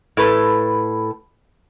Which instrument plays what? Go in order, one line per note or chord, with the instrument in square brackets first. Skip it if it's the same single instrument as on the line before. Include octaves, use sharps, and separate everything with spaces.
[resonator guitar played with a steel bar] A2 A4 B4